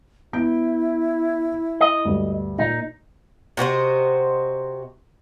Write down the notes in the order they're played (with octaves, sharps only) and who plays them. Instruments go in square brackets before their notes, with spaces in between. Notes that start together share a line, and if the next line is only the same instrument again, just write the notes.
[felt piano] B3 G6 D7 [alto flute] E4
[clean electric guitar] D#5
[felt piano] D2 G2
[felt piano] A#2 [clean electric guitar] D#4
[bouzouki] C3 F#4 C5 D#5